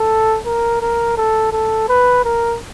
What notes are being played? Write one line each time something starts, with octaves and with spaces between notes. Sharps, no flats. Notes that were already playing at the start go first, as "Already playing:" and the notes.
Already playing: A4
A#4
A#4
A4
A4
B4
A#4